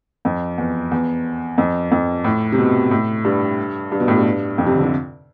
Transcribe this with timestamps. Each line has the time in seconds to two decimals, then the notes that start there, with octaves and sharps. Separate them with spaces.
0.25 F2
0.58 E2
0.91 E2
1.58 F2
1.91 F2
2.24 A2
2.52 C3
2.58 B2
2.91 A2
3.25 G2
3.92 G2
4.00 B2
4.08 A2
4.17 G2
4.58 F2
4.67 C3
4.75 D3
4.83 C3